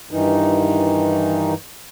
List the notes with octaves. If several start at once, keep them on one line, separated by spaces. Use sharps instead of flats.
G2 D#3 E3 D#4